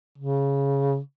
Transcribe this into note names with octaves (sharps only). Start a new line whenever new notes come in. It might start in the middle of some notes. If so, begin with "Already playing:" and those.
C#3